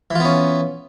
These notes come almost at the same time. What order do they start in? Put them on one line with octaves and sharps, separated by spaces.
E3 F4 B3 C#4